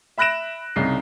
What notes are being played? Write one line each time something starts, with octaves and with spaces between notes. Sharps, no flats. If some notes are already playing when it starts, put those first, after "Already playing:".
E5 B5 F#6 A#6 D7 E7
C2 C#3 D#4 C7